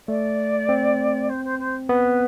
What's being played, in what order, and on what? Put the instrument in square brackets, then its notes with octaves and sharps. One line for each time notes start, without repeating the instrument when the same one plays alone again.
[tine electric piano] A3 [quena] D5
[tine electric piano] C4
[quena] C5
C5
C5
[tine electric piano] B3 [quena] B4